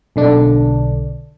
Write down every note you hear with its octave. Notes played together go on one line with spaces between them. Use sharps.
B1 D3 D4